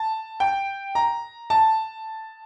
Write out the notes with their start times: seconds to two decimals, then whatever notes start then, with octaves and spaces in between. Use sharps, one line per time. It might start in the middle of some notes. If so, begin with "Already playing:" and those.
Already playing: A5
0.40 G5
0.95 A#5
1.50 A5